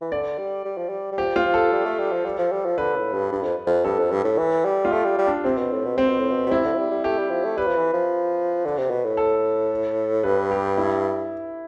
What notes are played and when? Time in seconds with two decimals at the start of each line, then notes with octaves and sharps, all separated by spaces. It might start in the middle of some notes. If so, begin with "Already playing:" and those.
0.01 E3
0.12 D3 D5
0.38 G3
0.64 G3
0.77 F3
0.89 G3
1.12 G3
1.18 F3 G4
1.36 F4
1.45 F3
1.54 A4
1.72 G3
1.85 A3
1.99 G3
2.12 F3
2.25 G3
2.38 F3
2.52 G3
2.65 F3
2.78 D3 B4
2.96 A2
3.13 G2
3.32 G2
3.43 F2
3.66 F2
3.85 G2 A4
3.99 F2
4.11 G2
4.24 A2
4.38 E3
4.65 G3
4.85 F4
4.91 A3 G4
5.05 G3
5.18 G3
5.27 D4
5.44 C3 C4
5.58 B2
5.71 A2
5.85 B2
5.97 C3 C4
6.08 B2
6.19 A2
6.30 B2
6.46 B2
6.51 C3 E4
6.64 D3
6.73 F3
6.78 G3
6.90 G3
7.04 A3 G4
7.18 G3
7.30 F3
7.44 A3
7.57 G3 B4
7.67 F3
7.76 E3
7.93 F3
8.65 D3
8.77 C3
8.90 B2
9.04 A2
9.17 A4
10.23 G2 B4
10.51 G4
10.77 E4